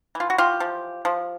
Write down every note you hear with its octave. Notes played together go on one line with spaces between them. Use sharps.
E3
F4
F#4
F4 G4
F3
F3